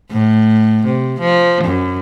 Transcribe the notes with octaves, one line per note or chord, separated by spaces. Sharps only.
A2
C3
F3
F#2